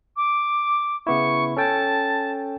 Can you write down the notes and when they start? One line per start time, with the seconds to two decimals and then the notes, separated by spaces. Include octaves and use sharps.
0.17 D6
1.07 C#3 B3 E4 C#6
1.57 C#4 A4 G5 A5